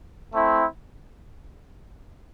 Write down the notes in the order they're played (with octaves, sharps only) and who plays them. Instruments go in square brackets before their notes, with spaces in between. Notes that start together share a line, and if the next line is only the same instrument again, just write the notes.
[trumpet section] A3 C4 E4